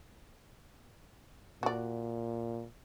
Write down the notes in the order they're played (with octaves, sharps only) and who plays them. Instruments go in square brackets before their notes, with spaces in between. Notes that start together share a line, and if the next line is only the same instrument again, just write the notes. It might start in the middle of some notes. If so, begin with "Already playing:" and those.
[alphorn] A#2 [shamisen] F#4 D5